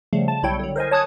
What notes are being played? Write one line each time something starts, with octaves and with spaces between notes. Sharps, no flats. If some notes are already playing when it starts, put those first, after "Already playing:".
C#3 F3 G3 A3
A5
B1 G3 E4 C#5 G5
D3 F#3
A#4 C5 D#5 G#5
C#5 A5 D#6 F#6 G#6